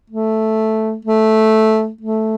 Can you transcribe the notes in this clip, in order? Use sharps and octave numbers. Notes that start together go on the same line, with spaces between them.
A3
A3
A3